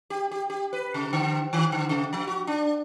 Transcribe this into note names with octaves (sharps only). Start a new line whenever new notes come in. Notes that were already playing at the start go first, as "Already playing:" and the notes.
G4
G4
G4
B4
C3
D3
D#3
D3
C3
F3
F#4
D4